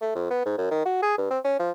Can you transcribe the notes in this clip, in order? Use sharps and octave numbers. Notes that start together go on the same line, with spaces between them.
A3
F2
B3
G#2
F#2
D#3
F#4
G#4
G2
C4
C#4
F3